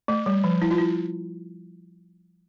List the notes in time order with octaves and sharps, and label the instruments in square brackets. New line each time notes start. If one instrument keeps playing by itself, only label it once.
[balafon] A3
G3
F3
E4
F4
E4